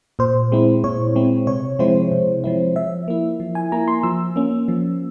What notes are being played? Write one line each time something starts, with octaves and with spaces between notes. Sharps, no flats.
A#2 C5
G#3 C4 E4
A#2 C#5
G#3 C4 E4
C3 C#5
F3 G#3 C4 E4 C5
C3
F3 G#3 C4 E4
F3 E5
A#3 E4
F3
G#5
A#3 E4 A#5
C6
F3 E6
A#3 C#4
F3